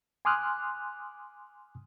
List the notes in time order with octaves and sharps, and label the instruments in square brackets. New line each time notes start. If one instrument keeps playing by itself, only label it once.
[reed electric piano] G#5 C6 D6 D#6 F6 F#6